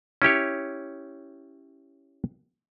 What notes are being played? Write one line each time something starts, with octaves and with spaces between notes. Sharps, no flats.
C#4 E4 G4 C#5